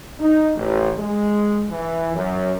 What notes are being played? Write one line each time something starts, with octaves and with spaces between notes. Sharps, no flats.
D#4
A1
G#3
E3
F#2